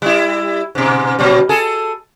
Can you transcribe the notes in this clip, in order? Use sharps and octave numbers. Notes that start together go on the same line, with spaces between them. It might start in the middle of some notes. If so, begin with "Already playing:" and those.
G3 E4
G#2 B2
A#2 F#3 G3
G#4 A4